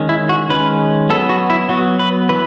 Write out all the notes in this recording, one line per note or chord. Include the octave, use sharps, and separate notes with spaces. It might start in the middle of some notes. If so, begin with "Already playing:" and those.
Already playing: D#3 G#3 C#4
E4
F#4
D#3 G#3 C#4 B4
F#3 B3 A4
F#4
E4
F#3 B3 F#4
B4
E3 B4